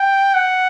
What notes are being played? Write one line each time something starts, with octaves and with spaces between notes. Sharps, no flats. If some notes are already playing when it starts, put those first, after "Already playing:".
Already playing: G5
F#5